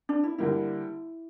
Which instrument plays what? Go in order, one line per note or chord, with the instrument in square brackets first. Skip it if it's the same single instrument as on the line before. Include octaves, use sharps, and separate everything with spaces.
[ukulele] D4
E4
[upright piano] D3 G3 A#3 [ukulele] E4